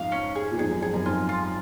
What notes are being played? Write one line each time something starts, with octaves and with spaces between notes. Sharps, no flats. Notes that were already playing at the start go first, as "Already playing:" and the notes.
Already playing: F2 G#2 F5
C#4
G#4
A#2
F2 G#2 G#4
F#2
F2 G#4
F#2
F2 G#2 F4
F4